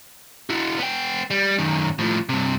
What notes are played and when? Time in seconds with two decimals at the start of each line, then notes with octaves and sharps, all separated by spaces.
0.50 E4 F#4
0.78 B3 G5
1.30 G3
1.58 F#2 D#3
1.99 A2 F3
2.29 G2 C3